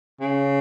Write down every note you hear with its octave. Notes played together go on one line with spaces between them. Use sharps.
C#3